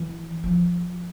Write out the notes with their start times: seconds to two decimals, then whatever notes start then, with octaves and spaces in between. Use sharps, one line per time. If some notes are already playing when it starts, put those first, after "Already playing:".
Already playing: E3
0.44 F3